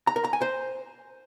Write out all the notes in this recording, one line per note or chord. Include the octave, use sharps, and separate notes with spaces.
A#5
A#4
A#5
G#5
C5